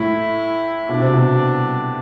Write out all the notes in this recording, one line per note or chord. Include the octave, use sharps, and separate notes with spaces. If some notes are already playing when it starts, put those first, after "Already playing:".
Already playing: A2 E4
B2 D4
C3
B2